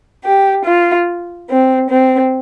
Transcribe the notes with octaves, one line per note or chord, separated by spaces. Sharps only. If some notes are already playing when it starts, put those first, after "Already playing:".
G4
F4
C4
C4